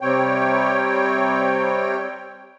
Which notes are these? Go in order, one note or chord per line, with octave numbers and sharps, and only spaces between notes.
C3 G3 C4 C#5 G5